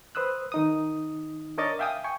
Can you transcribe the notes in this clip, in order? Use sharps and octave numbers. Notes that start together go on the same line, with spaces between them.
B4 C5 D#6 E6 F#6
D#3 D#4 D#6
D4 A#4 C#5 D#5 D6 A6
E5 F5 G5 G#5 D#6
G5 G#5 C#6